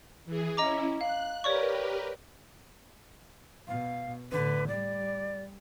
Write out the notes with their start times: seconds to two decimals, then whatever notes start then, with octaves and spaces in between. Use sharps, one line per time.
0.26 E3 G#4
0.57 C#4 E4 D#5 A#5 D6
1.01 F5 F#6
1.44 G4 A#4 B4 C#5 D5 C#6
3.68 B2 F5
4.32 A2 D3 B4
4.68 G3 D5